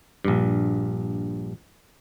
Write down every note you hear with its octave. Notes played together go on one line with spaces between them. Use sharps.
A#1 G2